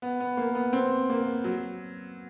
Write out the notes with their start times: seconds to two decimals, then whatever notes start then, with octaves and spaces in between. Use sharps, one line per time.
0.02 B3
0.20 B3
0.37 A#3
0.55 B3
0.73 C4
1.10 A#3
1.44 F#3